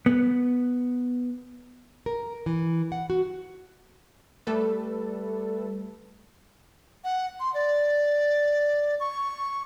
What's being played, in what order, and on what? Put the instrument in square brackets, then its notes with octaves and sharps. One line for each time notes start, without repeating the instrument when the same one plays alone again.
[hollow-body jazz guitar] B3
[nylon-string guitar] A#4
E3
F#5
F#4
[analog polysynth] G3 A3 A4 B4
[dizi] F#5
C6
D5
C#6